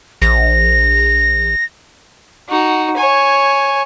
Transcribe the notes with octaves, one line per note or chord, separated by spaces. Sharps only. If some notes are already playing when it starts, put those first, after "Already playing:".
A#1 A#6
D#4 F#4
C#5 G#5